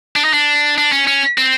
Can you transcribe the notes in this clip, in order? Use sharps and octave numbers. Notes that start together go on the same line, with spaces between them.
D4
D#4
D4
D4
C#4
C#4
C4